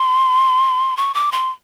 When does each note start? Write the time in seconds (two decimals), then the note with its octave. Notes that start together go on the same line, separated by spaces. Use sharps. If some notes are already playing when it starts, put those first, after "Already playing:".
Already playing: C6
0.97 C#6
1.14 D6
1.32 C6